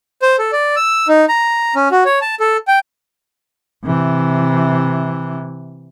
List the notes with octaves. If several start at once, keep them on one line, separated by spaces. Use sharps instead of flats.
C5
A4
D5
E6
D#4
A#5
C#4
F#4
C#5
A5
A4
G5
C3 E3